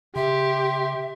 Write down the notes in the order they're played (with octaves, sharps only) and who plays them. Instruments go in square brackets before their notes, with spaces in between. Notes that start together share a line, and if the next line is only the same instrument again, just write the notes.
[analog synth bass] C#3 [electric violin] G4 [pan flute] E5 [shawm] C6